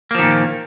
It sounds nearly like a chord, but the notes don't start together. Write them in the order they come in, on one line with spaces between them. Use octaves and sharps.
A#3 F3 D#3 A#2